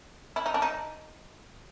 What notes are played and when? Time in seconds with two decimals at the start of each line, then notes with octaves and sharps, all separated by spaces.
0.36 E4
0.46 D#4
0.54 D4
0.62 D#4